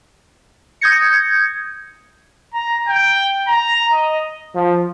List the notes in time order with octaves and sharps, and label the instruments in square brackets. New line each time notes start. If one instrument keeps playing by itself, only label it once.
[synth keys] D#6 G6 G#6 A#6 C#7
[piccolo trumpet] A#5
G5
A#5
D#5
[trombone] F3